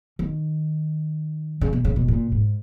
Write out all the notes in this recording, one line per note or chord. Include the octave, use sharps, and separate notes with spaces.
D#3
C#3
B2
C#3
B2
A#2
G#2